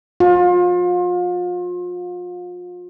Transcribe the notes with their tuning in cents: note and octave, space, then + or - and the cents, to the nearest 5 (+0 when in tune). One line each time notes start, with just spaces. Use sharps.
F4 +35